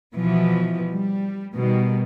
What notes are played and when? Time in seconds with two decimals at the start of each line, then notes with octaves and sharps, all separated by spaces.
0.14 B2 E3 F3
0.91 G3
1.55 B2 D#3 G3